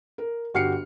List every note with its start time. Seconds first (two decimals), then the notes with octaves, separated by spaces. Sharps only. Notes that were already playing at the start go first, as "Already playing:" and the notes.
0.18 A#4
0.54 G1 F#4 G4 F6 C7 C#7